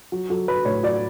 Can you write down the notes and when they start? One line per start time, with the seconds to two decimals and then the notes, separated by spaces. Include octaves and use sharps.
0.12 F#3
0.30 F#3 A4
0.48 F#3 B4
0.65 A2 C#5
0.83 F#3 D5